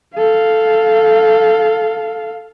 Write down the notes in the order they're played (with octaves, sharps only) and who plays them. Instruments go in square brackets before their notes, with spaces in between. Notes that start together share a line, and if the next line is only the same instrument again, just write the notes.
[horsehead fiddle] A4 F5